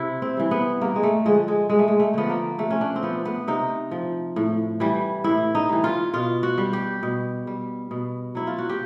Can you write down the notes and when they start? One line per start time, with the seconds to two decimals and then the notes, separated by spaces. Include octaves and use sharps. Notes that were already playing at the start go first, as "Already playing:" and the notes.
Already playing: C3 E4
0.22 C4
0.37 E3 G3
0.51 B3
0.81 G2 A#3
0.96 G#3
1.03 A3
1.25 D3 F3 G#3
1.48 G#3
1.70 G2 G#3
1.79 A3
1.88 G#3
2.00 A3
2.14 D3 F3 B3
2.29 A#3
2.58 C3 A3
2.70 C#4
2.81 D4
2.96 C4
3.03 F3 B3
3.25 B3
3.48 C3 D#4
3.91 F3
4.36 A2
4.80 E3 G3
5.24 A2 E4
5.55 D#4
5.69 E3 G3
5.84 F4
6.14 B2 F4
6.43 F#4
6.58 G3
6.73 G4
7.03 B2
7.47 G3
7.91 B2
8.35 F#3 E4
8.47 F4
8.58 F#4
8.69 G4